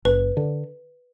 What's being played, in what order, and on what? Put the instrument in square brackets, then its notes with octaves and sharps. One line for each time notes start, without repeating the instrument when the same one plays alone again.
[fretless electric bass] F#1 [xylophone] B4
[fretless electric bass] D3